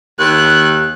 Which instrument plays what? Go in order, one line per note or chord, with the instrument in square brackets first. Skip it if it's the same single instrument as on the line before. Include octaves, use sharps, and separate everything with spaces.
[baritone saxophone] D#2 [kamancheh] F#6